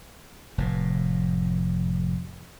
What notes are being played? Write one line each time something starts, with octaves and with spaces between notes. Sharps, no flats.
F1 A2